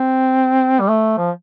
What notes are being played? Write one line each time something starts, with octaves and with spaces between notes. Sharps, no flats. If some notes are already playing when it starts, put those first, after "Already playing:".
Already playing: C4
G3
A3
F3